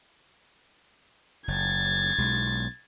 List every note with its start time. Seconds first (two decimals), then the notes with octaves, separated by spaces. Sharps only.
1.48 F#1 G#6 A6
2.18 B1 B2 G#3